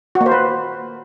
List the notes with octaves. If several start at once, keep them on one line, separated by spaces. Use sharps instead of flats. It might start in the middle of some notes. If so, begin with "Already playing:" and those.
F#4
A#3
C5
B4